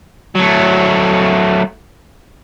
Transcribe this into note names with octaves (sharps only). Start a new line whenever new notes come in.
F#3 A3